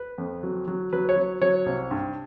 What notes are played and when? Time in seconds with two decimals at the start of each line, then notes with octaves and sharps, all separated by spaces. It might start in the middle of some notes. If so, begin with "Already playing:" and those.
Already playing: B4
0.18 F2
0.43 F#3
0.68 F#3
0.93 F#3 B4
1.09 C#5
1.16 F#3
1.42 F#3 C#5
1.66 C2
1.91 G2